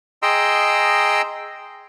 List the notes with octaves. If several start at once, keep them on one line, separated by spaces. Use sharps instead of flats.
G#4 D#5 G5 A#5 C6 E6